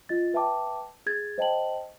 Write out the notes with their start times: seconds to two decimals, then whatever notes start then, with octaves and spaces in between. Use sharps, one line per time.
0.09 F4 D#5 A6
0.34 B4 E5 G5 A5 D6
1.06 G#4 G#6 A6
1.38 C5 D#5 G5 A5 F#7